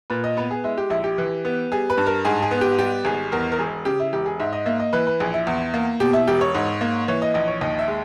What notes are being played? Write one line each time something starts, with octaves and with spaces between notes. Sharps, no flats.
A#2 B4
D#5
B3 B4
G#4
G#3 E4
G4
A#1 E4
G4
E3
B3
G3 G#4
B4
G2
A#4
G#2 G#4
G#4
B3
G4
G3 G4
G#1 G#4
E2 A#4
A#4
E1 G#4
C#3 G4
E4
E1 G4
G#4
G#2 E5
D#5
A#3 E5
D#5
E3 B4
B4
A#1 G#4
E4
E2
A#3
B2 G4
E4
E1 G4
C#5
G#2
A#3
E3 C#5
D#5
A#1 D#5
C#5
D#2 D#5
E5
G#3